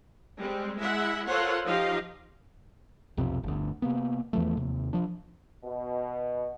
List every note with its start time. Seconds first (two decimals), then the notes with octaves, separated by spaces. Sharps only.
0.38 G3 G#3 C4
0.77 G#3 E4 E5 F#5
1.27 F4 A4 A#4 C5 C#5 F#5
1.64 F3 D#4 F4 G4 D#5 F5
3.17 B1 F2 C3
3.44 G1 D2
3.82 C3 A#3 B3
4.33 E2 E3 F3 A3
4.57 D#2 C3
4.93 F3 D4
5.64 B2